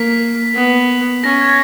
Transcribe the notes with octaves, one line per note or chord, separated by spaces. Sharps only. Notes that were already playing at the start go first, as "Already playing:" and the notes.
Already playing: A#3 B6
B3
C#4 A#6
G#6